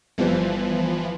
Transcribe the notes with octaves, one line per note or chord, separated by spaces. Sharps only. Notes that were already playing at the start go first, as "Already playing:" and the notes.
G1 E3 F3 G3 C5